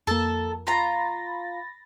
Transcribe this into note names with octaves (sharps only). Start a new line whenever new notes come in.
F2 A#3 A4 A5
F4 A#5 B5 A6 A#6